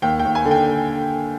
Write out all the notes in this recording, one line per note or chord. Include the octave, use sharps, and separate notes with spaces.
D#2 G5
G5
D#2
G#5
D3
G5